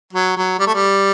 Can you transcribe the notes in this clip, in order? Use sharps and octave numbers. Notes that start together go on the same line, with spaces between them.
F#3
F#3
G3
A3
G3